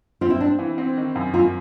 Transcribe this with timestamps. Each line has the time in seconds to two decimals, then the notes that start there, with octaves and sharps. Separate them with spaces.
0.21 C4 F4
0.30 E4
0.41 C4 D4
0.59 E3
0.78 C4
0.97 D#3
1.16 F#2
1.34 F#2 F4